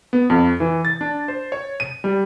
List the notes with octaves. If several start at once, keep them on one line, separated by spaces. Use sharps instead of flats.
B3
F2
E3
A6
D4
C5
C#5
D#7
G3